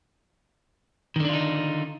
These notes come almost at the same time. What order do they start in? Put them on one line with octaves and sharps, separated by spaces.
D#3 D3 D4 F4 D#4